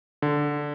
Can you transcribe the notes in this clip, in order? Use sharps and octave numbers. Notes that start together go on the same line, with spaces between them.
D3